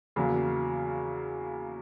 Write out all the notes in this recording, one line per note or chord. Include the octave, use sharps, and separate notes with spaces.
E2 C#3 F#3 A#3